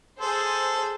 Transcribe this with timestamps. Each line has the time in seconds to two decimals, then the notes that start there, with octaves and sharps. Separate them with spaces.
0.20 G#4 A4 C5